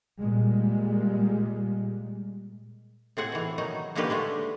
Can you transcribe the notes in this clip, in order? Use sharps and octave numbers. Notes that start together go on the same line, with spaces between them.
A#2 G3 G#3
A2 C4 G#4 F#5
B2 E3
D#3 F#3 D#4
D3 A#3 C#4 D#4 G4 B4
D3 G#3 A3